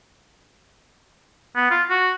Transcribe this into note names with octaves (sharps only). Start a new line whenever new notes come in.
B3
F4
F#4